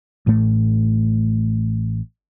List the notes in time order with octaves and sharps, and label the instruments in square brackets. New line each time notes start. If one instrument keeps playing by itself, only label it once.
[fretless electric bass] A1 A2 A3